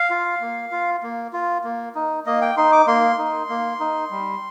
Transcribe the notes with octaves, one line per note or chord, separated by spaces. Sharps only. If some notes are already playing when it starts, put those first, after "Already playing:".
Already playing: F5
F4
A#3
F4
A#3
F4
A#3
D#4
A#3 D#5
G5
D#4 C6
D6
A#3 C6
D#4
A#3
D#4
G3